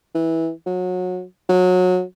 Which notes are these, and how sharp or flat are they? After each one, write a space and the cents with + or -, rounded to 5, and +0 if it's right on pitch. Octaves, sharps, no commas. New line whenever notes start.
E3 -15
F#3 -25
F#3 -25